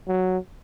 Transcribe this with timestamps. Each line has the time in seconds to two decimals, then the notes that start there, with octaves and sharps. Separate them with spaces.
0.08 F#3